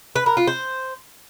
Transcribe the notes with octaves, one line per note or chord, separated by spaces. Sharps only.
B4
A#4
F4
C5